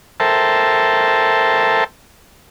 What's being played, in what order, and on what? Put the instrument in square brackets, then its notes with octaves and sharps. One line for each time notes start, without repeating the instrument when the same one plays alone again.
[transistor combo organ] A4 A#4 C5 E5 G5 A5